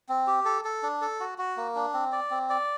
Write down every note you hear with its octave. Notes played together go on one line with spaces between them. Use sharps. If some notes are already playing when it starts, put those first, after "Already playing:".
C4
G4
A4
A4
D4
A4
F#4
F#4
A#3
D4
C4
D5
C4
D5